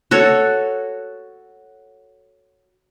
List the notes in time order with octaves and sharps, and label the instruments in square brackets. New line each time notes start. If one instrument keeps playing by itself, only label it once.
[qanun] F#4 A4 C#5